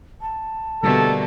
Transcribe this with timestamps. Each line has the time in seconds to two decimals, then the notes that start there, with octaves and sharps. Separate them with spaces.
0.21 A5
0.83 B2 D3 G3 A3 A#3 A4